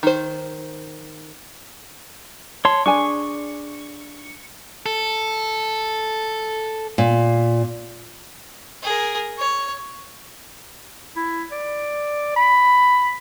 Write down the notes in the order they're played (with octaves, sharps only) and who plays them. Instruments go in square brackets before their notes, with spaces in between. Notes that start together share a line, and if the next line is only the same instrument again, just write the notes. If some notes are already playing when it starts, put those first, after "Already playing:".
[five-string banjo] D#3 C5
[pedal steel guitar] C#5 C6 [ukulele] A5
[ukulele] D4 G#4 G#5 [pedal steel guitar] C#6
[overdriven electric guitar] A4
[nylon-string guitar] A#2
[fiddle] G#4 A#4
C#5
[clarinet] E4
D5
B5